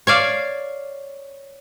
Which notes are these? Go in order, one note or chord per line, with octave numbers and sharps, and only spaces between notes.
C#5 D5 F5